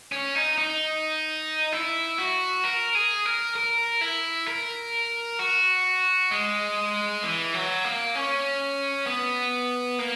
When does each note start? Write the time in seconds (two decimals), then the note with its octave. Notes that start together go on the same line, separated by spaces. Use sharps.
0.12 C#4
0.35 D#4
0.58 D#4
1.72 E4
2.18 F#4
2.64 A#4
2.95 G#4
3.25 A#4
3.56 A#4
4.01 E4
4.48 A#4
5.39 F#4
6.31 G#3
7.23 E3
7.54 F#3
7.84 A#3
8.15 C#4
9.07 B3
9.99 A#3